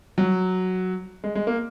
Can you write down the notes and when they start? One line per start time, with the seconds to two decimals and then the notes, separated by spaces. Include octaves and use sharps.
0.18 F#3
1.24 G#3
1.35 G#3
1.47 A#3